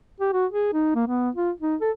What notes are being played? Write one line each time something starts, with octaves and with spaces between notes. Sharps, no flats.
G4
F#4
G#4
D#4
A#3
B3
F4
D#4
A4